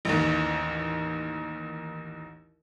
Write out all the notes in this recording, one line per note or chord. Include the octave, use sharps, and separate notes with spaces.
A1 D#2